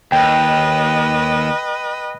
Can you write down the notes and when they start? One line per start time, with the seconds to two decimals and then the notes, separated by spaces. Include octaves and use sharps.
0.12 D#2 B4 D#5 G5